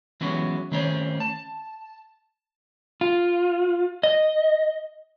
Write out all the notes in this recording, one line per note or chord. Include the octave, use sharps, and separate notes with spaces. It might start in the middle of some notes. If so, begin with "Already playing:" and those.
E3 F#3 G#3 B3 C#4
D#3 A3 C4 C#4 C#5
A5
F4
D#5